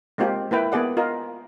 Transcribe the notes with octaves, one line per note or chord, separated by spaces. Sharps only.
G#3 A#3 C4 F4 G4
A#3 E4 B4 G5
A#3 B3 G#4 D5 F#5
F4 A#4 D#5